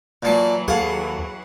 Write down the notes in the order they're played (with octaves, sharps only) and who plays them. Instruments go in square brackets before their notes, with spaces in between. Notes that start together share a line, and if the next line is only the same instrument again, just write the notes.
[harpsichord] A#2 A5 [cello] E3 F#3
[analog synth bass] D#2 [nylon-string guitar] G#4 A4 F5 [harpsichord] F#5